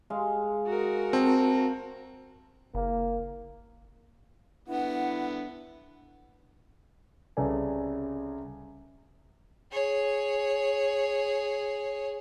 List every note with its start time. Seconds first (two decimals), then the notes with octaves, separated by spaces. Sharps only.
0.10 G#3 F5
0.67 F#4 A#4
1.13 C4 A5
2.75 F#1 A#3
4.68 D3 B3 E4 F#5
7.37 C2 C#3 A4 B4 D5 G#5
9.72 G#4 C#5